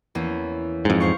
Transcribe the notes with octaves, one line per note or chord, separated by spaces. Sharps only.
E2 A#3 C#4
F2 G#2
C5 F5 C#6